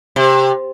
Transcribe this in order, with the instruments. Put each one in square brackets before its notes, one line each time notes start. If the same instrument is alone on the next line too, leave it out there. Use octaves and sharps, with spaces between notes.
[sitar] C3